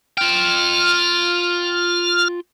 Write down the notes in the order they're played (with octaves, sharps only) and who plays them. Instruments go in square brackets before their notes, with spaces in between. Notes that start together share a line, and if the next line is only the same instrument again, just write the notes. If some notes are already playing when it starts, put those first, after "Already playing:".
[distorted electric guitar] F4 G5 [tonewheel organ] F6